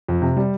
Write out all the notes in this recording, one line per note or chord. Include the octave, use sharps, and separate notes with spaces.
F2
C3
G3